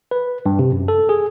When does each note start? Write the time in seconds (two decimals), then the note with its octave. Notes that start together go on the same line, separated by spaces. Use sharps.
0.11 B4
0.46 G2
0.59 C3
0.72 F#2
0.88 A4
1.09 G#4